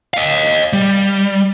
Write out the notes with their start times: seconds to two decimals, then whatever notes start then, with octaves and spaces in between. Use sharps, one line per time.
0.14 D#5 F5
0.73 G3